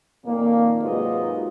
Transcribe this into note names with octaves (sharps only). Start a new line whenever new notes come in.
F2 A#2 D#3 A#3
G#2 C3 F#3 F4 B4 D#5